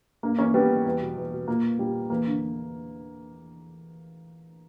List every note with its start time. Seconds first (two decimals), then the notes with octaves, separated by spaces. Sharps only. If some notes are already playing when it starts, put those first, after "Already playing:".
0.23 G2 A#3
0.38 E3 A#3 C#4
0.54 G2 G3 B3
0.70 E3
0.85 E2
1.01 B2
1.17 E2
1.32 B2
1.48 A#2 A#3
1.79 A#2 G3
2.10 E2 A#3
2.26 D3